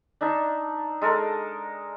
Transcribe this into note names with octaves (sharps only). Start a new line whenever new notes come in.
D4 D#4 E5 A5
G#3 A4 A#4